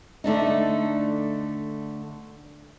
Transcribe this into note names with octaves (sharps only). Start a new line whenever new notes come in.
D3 A3 D4 D#4